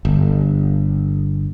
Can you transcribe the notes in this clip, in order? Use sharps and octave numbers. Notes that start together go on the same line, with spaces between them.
G1